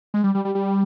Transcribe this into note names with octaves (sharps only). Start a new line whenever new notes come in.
G#3
G3
G3
G3
G3